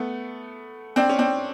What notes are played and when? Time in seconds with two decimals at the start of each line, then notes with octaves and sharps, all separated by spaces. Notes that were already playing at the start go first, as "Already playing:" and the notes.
Already playing: A3 B3
0.96 C4 D4
1.09 C#4
1.18 C4 D4